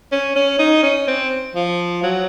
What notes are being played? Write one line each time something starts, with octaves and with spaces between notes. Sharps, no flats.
C#4
C#4
D#4
C#4
C4
F3
F#3